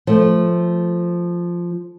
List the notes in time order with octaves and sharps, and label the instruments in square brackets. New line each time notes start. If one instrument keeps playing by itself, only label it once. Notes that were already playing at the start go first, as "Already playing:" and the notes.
[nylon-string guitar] F3 A3